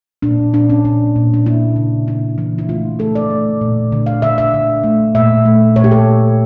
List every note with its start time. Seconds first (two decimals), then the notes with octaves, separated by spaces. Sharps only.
0.22 A#2 D4
0.53 A#2 D4
0.70 C#4
0.85 A#2 D4
1.16 A#2
1.34 D4
1.46 A#3 E4
1.76 C#3
2.07 E3 E4
2.38 E3
2.58 E4
2.69 A3 F4
2.99 A3 A4
3.15 D5
3.30 A3
3.61 A#2
3.92 D3
4.06 F5
4.22 D3 E5
4.38 E5
4.54 D3
4.83 A3
5.15 A#2 E5
5.45 A3
5.76 A#2 C#5
5.84 G4
5.91 A4